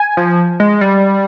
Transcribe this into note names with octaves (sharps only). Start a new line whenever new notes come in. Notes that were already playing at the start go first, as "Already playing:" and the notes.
Already playing: G#5
F3
G#3
G3